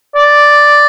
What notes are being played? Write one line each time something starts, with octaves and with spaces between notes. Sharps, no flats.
D5